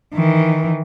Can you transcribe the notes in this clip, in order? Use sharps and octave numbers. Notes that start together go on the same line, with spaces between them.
D#3 E3